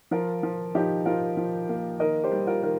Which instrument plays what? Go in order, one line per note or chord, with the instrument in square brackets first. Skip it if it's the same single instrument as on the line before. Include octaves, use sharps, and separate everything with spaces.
[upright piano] F3 F4 A#4
F3
F3 D#4 G4
F3 F4 A#4
F3
A#3
D#3 A#4 D#5
G4 C5
G3
F4 A#4
D#3 A#4